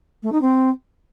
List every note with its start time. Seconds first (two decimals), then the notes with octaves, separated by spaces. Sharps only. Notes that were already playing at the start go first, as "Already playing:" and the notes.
0.23 A3
0.32 D#4
0.41 C4